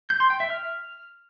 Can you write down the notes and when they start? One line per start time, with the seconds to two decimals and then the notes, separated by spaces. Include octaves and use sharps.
0.10 G6
0.20 C6
0.30 G5
0.40 E5
0.50 F6